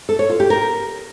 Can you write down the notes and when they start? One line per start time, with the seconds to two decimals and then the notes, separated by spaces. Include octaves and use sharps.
0.09 A4
0.19 C#5
0.29 F4
0.40 G4
0.50 A#4